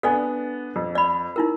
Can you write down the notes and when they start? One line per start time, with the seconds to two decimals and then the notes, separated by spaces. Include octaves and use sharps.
0.03 B3 D4 A4 D5 G#5
0.76 F2
0.95 D5 B5
1.36 D#4 E4 A#4